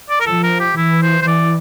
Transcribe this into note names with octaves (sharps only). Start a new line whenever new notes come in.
D5
A#4
F3 A4
A#4
G4
E3 E4
C5
C5
E3 D5